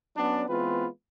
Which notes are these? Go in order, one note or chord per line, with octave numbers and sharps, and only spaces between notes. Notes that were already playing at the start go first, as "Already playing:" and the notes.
F#3 B3 C#4 D4
E3 G#3 B3 C4 F4 B4